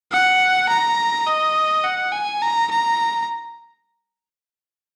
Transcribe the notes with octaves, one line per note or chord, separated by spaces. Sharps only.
F#5
A#5
D#5
F#5
G#5
A#5
A#5